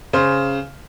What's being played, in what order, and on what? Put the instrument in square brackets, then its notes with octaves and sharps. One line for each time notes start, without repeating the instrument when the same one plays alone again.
[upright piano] C#3 C5